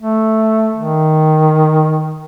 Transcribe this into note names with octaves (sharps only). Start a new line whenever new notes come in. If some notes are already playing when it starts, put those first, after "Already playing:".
A3
D#3